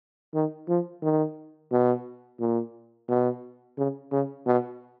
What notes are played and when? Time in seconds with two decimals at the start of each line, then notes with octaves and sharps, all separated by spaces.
0.34 D#3
0.68 F3
1.02 D#3
1.72 B2
2.40 A#2
3.08 B2
3.77 C#3
4.12 C#3
4.47 B2